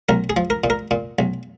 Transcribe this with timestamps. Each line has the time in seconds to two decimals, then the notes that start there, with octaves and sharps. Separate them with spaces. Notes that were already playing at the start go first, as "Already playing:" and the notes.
0.09 B1 A#4
0.30 G#4
0.37 F3
0.50 A#4
0.64 A#2
0.70 A#4
0.91 A#2
1.19 B1